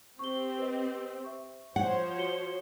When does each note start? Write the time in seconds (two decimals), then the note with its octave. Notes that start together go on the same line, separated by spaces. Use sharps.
0.19 C4 G4 C#6 G7
0.58 B4 D#5
1.24 E5 C#6
1.76 F3 C5 C#5 F#5
2.17 F#4 C#7 G7